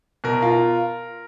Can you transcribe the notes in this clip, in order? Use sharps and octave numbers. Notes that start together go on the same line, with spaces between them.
B2 A#4
F4